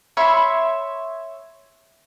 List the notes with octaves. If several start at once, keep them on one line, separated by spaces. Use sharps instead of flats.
C#5 E5 B5 C6